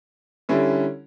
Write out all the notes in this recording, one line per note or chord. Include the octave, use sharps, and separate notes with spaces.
D3 G3 C#4 E4